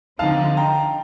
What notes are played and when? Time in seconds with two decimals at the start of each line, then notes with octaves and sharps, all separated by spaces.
0.19 D3 F3 C4 D#4 F5 A5
0.57 G5 A#5